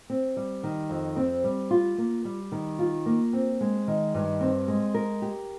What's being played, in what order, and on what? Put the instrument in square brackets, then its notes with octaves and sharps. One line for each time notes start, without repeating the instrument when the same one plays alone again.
[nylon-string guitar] C4
G3
D#3
F2
C4
G3
F4
A#3
G3
D#3
F4
A#3
C4
G#3
D#3
G2
C4
G#3
A#4
G4